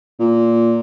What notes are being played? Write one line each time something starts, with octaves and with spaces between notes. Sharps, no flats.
A#2